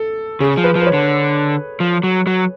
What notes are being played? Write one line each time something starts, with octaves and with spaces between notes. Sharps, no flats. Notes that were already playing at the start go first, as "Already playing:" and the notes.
Already playing: A4
C#3 G#4
F3
B4
F3
B4
C#5
D3
F3
F#3
F#3